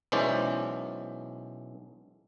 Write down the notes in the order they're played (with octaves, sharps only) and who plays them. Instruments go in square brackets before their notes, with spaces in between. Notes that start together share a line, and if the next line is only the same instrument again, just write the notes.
[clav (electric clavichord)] B1 E3 G#3 C#4 C5 D5